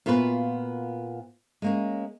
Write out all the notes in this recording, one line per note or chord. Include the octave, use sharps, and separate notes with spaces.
A#2 B3 F4 F#4 B4
G#3 A#3 C#4